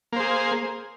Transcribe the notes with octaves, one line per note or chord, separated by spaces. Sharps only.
A#3 G#4 C5